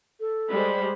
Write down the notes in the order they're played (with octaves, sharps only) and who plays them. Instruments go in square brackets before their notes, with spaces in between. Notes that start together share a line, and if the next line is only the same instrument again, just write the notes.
[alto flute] A4
[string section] G3 G#3 [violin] C5 B5